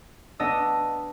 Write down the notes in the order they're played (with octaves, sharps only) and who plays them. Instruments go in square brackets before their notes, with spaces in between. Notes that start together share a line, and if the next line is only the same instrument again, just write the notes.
[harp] B3 D4 D#5 A5 E6